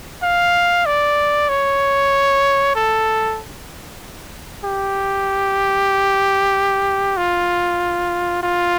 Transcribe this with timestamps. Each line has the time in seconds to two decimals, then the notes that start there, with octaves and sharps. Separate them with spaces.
0.23 F5
0.86 D5
1.49 C#5
2.75 A4
4.65 G4
7.17 F4
8.43 F4